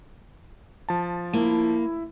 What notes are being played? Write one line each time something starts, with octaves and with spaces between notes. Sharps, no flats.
F3 A5
A#3 E4